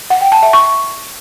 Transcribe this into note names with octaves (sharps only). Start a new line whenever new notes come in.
F#5
G5
A5
E5
C#6